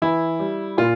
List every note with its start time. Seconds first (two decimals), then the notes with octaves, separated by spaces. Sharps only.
0.02 E3 E4
0.39 G3
0.78 A#2 F4